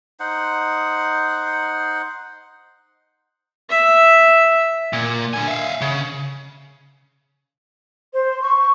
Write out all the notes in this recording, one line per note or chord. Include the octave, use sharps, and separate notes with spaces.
D#4 C5 F#5
E5
A#2
D3 G#5
E5 F5
C#3
C5
C#6